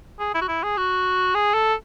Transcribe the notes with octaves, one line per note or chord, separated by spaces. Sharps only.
G#4
E4
F#4
E4
G#4
F#4
G#4
A4